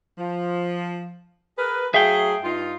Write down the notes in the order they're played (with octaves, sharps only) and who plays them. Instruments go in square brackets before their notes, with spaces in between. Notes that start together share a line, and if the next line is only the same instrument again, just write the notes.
[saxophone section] F3
G#4 A#4 B4
[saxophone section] F#3 A3 G#4 [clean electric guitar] E5 F5 G5
[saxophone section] G2 D#4 F4